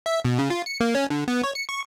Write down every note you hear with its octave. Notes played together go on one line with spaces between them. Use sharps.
E5
B2
C#3
F4
C#7
A#3
C#4
D3
B3
C#5
C#7
C#6